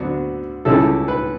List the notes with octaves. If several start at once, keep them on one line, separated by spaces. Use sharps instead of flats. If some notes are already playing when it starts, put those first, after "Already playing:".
Already playing: D2 D3 F#3 B3 D4 F#4
C#2 C#3 G3 C#4 E4 A4
B4